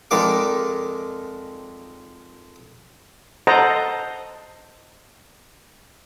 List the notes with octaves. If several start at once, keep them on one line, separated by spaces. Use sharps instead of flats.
F2 D#3 G#3 D5 F5 D6
A4 C5 D#5 F#5 A5 A#5